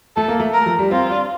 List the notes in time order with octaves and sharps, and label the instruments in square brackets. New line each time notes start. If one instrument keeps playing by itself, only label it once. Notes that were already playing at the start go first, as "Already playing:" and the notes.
[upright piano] A3 [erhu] A4
[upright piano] A#3
A3
[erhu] A#4
[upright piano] F3
G3
[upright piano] C4 [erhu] F4
[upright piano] D4